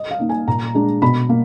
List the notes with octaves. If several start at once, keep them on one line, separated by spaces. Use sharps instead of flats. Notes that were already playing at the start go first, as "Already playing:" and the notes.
Already playing: D#5
F5
A#3 D#4
G#5
A#2 A#5
G#3 D4
B2 B5
A#3